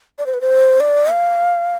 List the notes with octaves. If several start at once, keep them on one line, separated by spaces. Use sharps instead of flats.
D5
C5
B4
C5
D5
F5